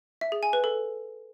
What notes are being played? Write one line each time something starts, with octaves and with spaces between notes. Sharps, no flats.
E5
G#4
G#5
B4
A4